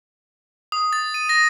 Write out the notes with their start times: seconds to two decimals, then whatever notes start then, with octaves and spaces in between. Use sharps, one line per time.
0.72 D#6
0.93 A6
1.14 D#7
1.29 A#6